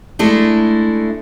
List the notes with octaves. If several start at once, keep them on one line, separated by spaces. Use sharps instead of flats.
G#3 A3 D4 E4